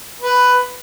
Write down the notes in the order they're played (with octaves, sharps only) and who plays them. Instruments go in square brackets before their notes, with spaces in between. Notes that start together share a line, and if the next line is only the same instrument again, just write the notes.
[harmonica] B4